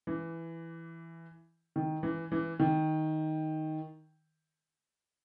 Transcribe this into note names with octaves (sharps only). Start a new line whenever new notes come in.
E3
D#3
E3
E3
D#3